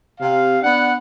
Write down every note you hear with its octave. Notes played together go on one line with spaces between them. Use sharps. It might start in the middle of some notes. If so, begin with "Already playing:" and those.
C3 F5
B3 D4 F#5